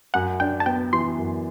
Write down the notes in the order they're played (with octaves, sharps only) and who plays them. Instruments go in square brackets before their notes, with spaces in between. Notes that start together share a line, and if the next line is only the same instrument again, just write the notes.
[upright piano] F#2 [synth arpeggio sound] F#5
[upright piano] D4 [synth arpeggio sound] G5
[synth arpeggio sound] A5
[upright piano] B3 [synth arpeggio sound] G5
[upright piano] E3 [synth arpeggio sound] C6
[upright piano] F#2